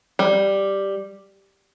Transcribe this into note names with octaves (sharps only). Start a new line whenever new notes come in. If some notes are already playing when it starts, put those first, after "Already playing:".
G3